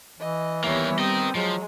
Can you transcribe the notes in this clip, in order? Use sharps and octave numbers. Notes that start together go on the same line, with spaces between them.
E3 D#5
D#3 G3 A#3 B3 E4 C#5
C4 A#4 D#5 D#6
F3 F#3 G#3